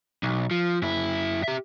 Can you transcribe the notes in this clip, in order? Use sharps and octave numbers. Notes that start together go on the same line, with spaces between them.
B1
F3
F#2 E4
G4 E5